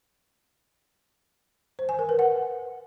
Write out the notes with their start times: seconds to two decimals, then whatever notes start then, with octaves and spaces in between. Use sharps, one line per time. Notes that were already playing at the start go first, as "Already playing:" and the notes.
1.79 C5
1.89 G#5
1.99 A#4
2.09 B4
2.19 F#5